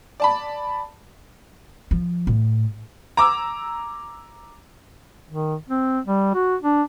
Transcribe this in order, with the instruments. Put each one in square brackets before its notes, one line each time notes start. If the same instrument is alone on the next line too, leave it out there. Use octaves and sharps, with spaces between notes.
[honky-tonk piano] D5 A5 B5
[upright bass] F3
A2
[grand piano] A#5 D6 E6
[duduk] D#3
C4
G3
F#4
D4